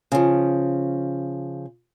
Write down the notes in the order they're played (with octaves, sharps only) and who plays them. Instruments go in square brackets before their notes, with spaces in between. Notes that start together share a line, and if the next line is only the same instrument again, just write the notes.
[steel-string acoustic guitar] C#3 F3